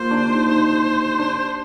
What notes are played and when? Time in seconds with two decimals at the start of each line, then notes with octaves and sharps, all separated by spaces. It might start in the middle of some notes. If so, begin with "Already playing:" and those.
Already playing: A#3 F4 C5
0.11 D4
0.29 D#4
0.47 D#4
1.19 D4